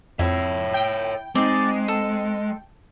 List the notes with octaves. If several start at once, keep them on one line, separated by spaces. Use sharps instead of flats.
F2 E4 C#5 E5
G5
G#3 C4 D#4 D5
A4